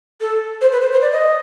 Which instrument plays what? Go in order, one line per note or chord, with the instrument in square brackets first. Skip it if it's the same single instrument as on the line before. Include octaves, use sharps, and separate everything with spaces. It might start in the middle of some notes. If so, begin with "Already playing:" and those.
[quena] A4
C5
B4
C5
C5
D5
D#5